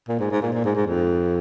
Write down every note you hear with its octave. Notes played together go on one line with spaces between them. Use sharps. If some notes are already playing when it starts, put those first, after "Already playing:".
A#2
G#2
G#2
A#2
A#2
G#2
G#2
F2